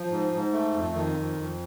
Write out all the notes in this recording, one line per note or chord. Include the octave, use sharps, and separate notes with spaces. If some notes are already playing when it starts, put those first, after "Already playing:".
Already playing: F3
G#2
G#2
A3
F2
D#3
F2
F2